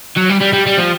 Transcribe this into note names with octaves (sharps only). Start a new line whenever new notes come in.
F#3
G3
G3
G3
G3
F3